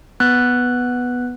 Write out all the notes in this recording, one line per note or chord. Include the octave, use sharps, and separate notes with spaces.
B3 F#6